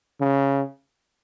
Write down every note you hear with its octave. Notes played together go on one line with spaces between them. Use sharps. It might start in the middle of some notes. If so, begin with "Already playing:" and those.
C#3